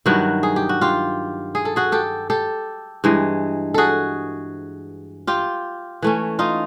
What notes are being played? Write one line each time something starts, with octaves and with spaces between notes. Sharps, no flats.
G2 D#3 F#3 E4 F#4
G#4
G4
F#4
F4 G4
G#4
A4
F#4 G#4
G4 A4
G4 A4
G2 E3 G#3
F#4 G#4 A4
F4 G4
E3 A3 C#4
D#4 F4